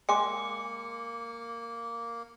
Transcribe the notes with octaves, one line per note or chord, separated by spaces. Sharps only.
G#3 A#3 G#5 D6 C#7